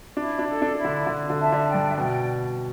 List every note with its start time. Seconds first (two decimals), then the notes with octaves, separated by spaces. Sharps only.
0.16 D4 E4
0.39 D4
0.47 A4
0.62 D4
0.77 E4
0.85 D3
1.07 D3
1.30 D3
1.37 E5 A5
1.52 D3
1.67 D5 G5
1.74 G2
1.89 E5
1.97 B2 D5 G5